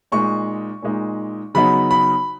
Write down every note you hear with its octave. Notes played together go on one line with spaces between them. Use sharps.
A#2 G#3 D#4 C#6
A#2 G#3 D#4
C#3 F#3 B3 D#4 B5
B5